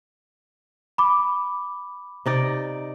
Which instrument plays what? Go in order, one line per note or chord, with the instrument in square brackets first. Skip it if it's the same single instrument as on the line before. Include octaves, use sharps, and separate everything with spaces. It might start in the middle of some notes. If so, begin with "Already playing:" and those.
[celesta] B5 D6
[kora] C3 D#4 D5